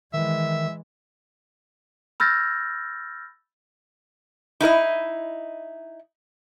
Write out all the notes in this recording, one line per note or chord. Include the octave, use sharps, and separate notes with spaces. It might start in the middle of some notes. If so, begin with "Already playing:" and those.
D#3 E3 G#3 E5
B5 E6 F6 G6 A6 A#6
D#4 E4 A#4 D#5